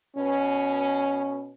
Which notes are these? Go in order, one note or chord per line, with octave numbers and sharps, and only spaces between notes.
B2 C#4